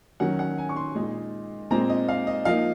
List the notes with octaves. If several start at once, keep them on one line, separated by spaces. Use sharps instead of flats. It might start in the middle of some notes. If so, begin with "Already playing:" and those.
D#3 F#3 C#4 F#5
F#5
G#5
C#6
C6
A#2 G#3 D#4
A#2 G#3 C4 A#5
D#5
F5
D#5
F3 A#3 D#4 F5